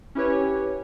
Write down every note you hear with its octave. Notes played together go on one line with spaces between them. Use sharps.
C#4 E4 G4 B4 C#5